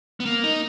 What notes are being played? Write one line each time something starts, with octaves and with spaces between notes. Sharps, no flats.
B3
A#3
D#4